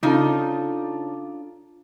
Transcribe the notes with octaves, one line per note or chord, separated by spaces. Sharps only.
C#3 D4 D#4 F4 A4